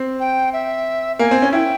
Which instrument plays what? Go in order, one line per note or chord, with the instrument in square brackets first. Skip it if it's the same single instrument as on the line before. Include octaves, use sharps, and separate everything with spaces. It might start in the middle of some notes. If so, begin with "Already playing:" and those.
Already playing: [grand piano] C4
[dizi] G5
E5
[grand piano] A#3 [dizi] G#5
[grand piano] C4
C#4
[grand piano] E4 [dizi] G5